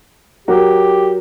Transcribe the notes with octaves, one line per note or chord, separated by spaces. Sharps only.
F#3 F#4 G4 A#4